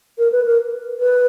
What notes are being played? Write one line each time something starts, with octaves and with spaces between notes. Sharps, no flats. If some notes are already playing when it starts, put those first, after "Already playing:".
A#4
B4
A#4
B4